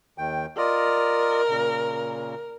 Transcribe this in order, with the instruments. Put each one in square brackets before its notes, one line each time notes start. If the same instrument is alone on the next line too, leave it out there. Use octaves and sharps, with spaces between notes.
[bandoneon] D#2 D#3 G5
[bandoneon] F4 D5 D#5 [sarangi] A#4
[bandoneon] A#2 C#3